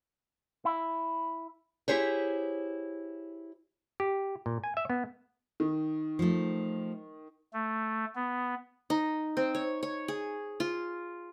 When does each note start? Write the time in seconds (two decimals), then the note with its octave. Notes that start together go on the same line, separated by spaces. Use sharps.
0.65 E4
1.88 E4 G4 G#4 C5 C#5
4.00 G4
4.46 A#2
4.64 G#5
4.77 E5
4.90 B3
5.60 D#3
6.19 F3 A3
7.53 A3
8.15 B3
8.90 D#4
9.37 C4
9.55 C#5
9.83 C#5
10.08 G#4
10.60 F4